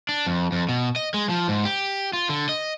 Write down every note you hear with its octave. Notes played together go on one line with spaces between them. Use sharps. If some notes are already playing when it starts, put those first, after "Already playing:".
D4
F2
F2
B2
D#5
G#3
F3
G#2
G4
F4
D3
D#5